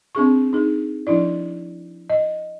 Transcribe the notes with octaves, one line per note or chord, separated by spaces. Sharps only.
C4 D4 G#4 C#6
D#4 G#4
F3 D4 E4 D5
D#5